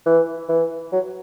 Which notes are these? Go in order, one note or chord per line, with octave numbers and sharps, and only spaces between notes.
E3
E3
F#3